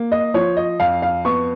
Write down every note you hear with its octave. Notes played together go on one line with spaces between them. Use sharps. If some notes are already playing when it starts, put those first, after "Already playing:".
Already playing: A#3
D#5
F3 C#5
D#5
F2 F5
F5
B3 C#6